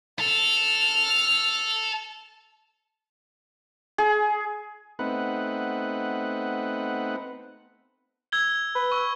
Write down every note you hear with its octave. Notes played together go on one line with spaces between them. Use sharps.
A4 F6
G#4
A3 B3 C4 D#4 B4 F#5
E6 G#6 G7
B4
C#6 E6